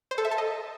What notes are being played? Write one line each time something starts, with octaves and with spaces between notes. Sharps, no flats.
C5
A4
E5
A5
D#5